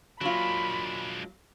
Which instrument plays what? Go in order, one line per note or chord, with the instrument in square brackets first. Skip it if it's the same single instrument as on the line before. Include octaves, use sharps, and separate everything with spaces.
[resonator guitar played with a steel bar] F#3 A#3 F4 [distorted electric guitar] G#3 D4 [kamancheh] B5